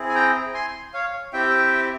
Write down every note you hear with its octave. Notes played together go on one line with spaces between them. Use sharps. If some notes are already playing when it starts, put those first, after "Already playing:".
Already playing: C4 E4 G#4
G#5
G5 A#5
G#5 C6
C#5 F5
C4 E4 G4 E5 G5